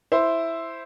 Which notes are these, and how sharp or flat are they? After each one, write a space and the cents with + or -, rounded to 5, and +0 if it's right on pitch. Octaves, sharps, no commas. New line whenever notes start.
E4 +0 C5 +0